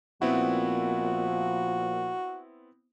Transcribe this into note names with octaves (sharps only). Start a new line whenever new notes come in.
A#2 F3 B3 C4 E4 F#4